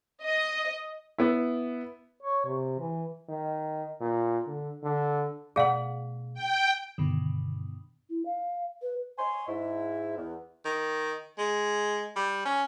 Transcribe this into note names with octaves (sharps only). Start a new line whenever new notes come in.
D#5
B3 E4
C#5
C3
E3
D#3
A#2
D3
D3
B2 A3 D4 G#4 D5 F5 F#5
G5
G2 B2 D3 D#3
E4
F5
B4
C#5 D#5 G#5 C6
G#2 E4
E2
D#3
G#3
G3
C#4